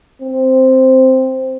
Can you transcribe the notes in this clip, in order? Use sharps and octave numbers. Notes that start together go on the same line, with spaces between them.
C4